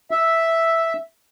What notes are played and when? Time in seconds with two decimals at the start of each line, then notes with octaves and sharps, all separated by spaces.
0.11 E5